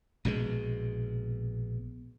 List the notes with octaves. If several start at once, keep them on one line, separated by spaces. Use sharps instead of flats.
A#1 B2 F3 G#3